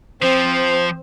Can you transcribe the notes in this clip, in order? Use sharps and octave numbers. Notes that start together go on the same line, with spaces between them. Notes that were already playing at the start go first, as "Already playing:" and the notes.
F3 C4 C5